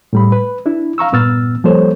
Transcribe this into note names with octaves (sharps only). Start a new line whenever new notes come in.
A2 G3 B5
B4
D4 E4
F5 A#5 C#6 E6
G2 A#2 B3 E6 F6 A6
F3 G3 A#3 A4 C5 C#5